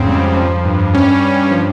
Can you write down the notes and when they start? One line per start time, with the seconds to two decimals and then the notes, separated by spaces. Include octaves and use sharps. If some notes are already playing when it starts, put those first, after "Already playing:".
Already playing: F2 G#2 C#3 C4
0.08 G3
0.23 F2
0.37 F3
0.51 F3
0.65 G2
0.80 G2
0.93 G3 C#4
1.08 G3
1.23 G2
1.36 G2
1.51 F3